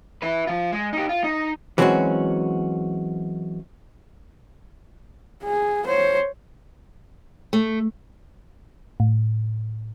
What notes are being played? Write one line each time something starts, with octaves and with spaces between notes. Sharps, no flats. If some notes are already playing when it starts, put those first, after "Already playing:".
E4 B4
F3 F4
G#3
D#4 G4
F4
D#4
E3 F#3 G#3 C4 C#4 F#4
G#4
C5 C#5
A3
A2